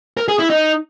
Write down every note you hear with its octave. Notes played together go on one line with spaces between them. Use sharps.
A#4
G#4
E4
D#4